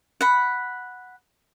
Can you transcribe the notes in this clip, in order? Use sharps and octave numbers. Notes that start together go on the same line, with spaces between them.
F#5 B5